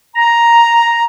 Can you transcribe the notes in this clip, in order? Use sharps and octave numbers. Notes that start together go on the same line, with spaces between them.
A#5